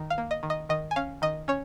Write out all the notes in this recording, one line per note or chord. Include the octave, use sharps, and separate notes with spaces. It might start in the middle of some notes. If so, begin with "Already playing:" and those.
Already playing: D#3
F5
A#3
D#5
D#3
D#5
D#3 D#5
G#5
C#4 F5
D#3 D#5
C#4 C#5